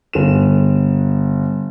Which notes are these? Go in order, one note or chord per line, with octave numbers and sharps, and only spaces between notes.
G1 E7